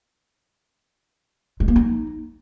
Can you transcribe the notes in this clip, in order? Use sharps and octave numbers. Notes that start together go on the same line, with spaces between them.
G#3
A#3
D#4